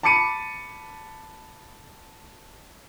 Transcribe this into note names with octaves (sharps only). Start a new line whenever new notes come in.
A5 B5 D6 C#7 D#7